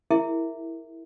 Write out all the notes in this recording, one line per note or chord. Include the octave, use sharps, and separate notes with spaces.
E4 G#4 A#4 E5